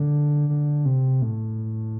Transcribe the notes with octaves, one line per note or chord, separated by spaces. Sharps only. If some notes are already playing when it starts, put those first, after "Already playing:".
Already playing: D3
D3
C3
A2